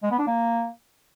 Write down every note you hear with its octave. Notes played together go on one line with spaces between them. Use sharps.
G#3
B3
D4
A#3